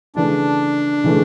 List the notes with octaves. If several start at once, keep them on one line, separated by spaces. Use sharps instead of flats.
C#3 E3 A3 D4
C#3 E3 A3